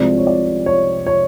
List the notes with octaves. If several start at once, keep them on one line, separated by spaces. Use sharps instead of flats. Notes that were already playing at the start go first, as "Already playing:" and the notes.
Already playing: C2 C3 F3 G#3 C4 D5
C#5
D5
C#5
C#5